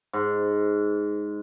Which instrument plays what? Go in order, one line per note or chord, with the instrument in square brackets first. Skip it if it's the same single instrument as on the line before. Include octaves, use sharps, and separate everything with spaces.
[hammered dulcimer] G#2